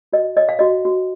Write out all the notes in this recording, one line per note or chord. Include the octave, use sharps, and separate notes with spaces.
F#4 D#5
C#5 D#5
F5
F#4 D#5
F#4